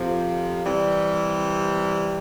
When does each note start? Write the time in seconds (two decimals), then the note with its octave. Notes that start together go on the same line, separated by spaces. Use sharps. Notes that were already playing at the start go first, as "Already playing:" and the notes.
Already playing: F2 C3 F3
0.64 C3 E3 G3